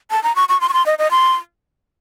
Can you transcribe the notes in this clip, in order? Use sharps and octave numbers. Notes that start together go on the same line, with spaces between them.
A5
A#5
C#6
C#6
C6
C#6
C6
D#5
D#5
C6